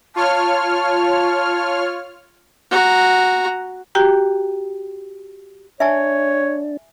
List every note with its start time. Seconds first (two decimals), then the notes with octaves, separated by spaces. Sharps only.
0.16 F4 C#5 A5 F6
2.71 F#4 A#5
3.95 F#4 G4 G5 A#5
5.80 D4 C#5 E5 G#5 A5